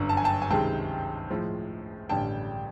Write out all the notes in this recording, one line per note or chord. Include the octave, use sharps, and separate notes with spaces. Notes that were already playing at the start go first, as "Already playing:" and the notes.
Already playing: G1 F#2 D3
A5
G#5
G5 A5
G#5
C#2 C3 D#3 G#3 G5 A5
A2 F3 G#3
A1 G2 D3 G3 G5 A5